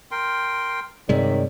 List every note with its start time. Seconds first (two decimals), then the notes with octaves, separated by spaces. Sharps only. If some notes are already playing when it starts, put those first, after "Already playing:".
0.11 A#4 G5 C6
1.09 G2 C3 D#3 G#3 C#5 D5 E5